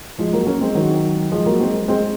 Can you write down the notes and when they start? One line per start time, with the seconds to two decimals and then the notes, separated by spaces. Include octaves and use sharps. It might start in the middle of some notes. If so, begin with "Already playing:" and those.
0.18 F3 G#3
0.33 F#3 A#3
0.47 A#3 C#4
0.61 G#3 C4
0.75 D#3 F#3
1.32 F3 G#3
1.46 F#3 A#3
1.60 G#3 C4
1.88 G#3 C4